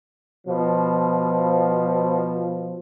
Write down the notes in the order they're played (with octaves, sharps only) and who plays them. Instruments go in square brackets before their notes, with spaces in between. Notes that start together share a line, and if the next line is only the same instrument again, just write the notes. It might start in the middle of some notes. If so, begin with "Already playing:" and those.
[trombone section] B2 F3